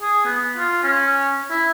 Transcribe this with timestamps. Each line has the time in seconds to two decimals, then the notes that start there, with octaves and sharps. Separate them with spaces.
0.02 G#4
0.25 B3
0.57 F4
0.84 C#4
1.51 E4